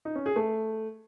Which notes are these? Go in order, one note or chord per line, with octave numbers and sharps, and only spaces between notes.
D#4
C#4
G#4
A3